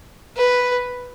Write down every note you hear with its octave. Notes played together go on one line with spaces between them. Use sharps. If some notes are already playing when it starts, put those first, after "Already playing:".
B4